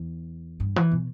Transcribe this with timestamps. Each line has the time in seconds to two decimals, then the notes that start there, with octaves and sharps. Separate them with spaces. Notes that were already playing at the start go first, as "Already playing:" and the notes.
Already playing: E2
0.60 G2
0.76 E3
0.92 B2